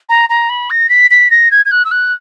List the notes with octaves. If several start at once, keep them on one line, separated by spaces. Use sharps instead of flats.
A#5
A#5
B5
A#6
B6
B6
A#6
G#6
G#6
F#6
E6
F#6